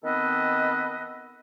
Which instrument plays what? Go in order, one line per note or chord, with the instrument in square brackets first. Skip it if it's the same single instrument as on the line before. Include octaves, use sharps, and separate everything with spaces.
[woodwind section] D#3 B3 C4 A4 B4 D#5